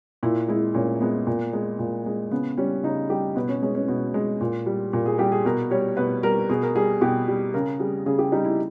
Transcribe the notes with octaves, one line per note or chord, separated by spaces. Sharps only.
A#2 E4
G#3 E4
A#2 C#4
G#3 B3
A#2
G#3
A#2
G#3
C#3 B3
G3 C#4
C#3 D#4
G3 G4
B2 B4
C#4
G#3 C#4
C#4
B2
G#3
A#2
G3
A#2
G#4
G3 G4
G#4
B2 A#4
G3 C#5
B2 B4
G3 A#4
B2 G#4
A#4
G3 G#4
B2 G4
G3
C#3 A#4
G3 G#4
C#3 G#4
G4
G3 D#4
E4